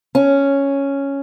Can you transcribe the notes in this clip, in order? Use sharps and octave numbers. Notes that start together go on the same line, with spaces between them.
C#4